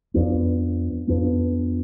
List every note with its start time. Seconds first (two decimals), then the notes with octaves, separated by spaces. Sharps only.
0.14 F2 F3 B3 D4
1.07 F2 F3 B3 D4